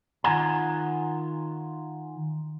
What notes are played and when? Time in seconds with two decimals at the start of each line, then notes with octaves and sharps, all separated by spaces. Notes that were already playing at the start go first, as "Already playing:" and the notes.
0.24 D#3 F4 F#5 G#5 A#5